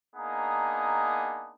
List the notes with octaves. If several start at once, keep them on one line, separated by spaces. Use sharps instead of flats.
A#3 B3 D4 D#4 G#4